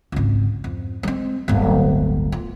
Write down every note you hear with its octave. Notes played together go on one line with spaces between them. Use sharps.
G#1 C#2
F2
G#3 C4
D1 G1
F4